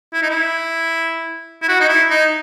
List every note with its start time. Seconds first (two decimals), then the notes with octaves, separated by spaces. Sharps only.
0.13 E4
0.22 D#4
0.30 E4
1.62 E4
1.68 F#4
1.80 D#4
1.89 E4
2.10 D#4